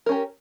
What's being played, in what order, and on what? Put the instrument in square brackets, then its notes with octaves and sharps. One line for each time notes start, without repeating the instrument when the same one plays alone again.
[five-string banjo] A#4
C#4
G4